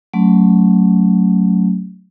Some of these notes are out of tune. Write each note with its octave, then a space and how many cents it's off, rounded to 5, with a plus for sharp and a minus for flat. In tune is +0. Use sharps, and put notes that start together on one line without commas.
F#3 +0 A3 +0 C#4 +0